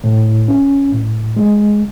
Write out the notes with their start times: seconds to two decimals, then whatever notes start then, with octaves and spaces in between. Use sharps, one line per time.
0.04 A2
0.48 C#4
0.92 A2
1.37 G#3